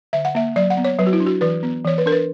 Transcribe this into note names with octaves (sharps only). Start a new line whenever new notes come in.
D3 E5
F#5
A#3 E5
F#3 D5
F#5
B3
C#5
F#3 B4
F#4
E4
D4
F#4
E3 B4
B3
E3 C#5
B4
D4 A#4
B4